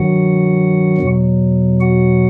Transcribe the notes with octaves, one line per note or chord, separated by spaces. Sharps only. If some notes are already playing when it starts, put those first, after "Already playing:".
Already playing: G2 D#3 F#3 F#4 F#5
E2 B2 F#3
F#4 F#5